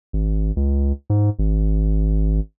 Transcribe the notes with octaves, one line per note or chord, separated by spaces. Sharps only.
G#1
C#2
G#2
G#1